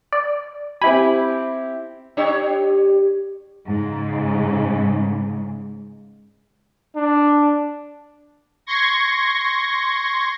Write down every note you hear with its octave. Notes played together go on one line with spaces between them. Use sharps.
D5
C4 E4 G4 G#5 B5
D4 G4 C#5
G#2 C#3
D4
C6 C#6 G#6 A#6